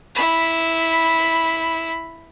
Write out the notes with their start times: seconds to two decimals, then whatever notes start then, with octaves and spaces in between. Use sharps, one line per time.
0.15 E4 B5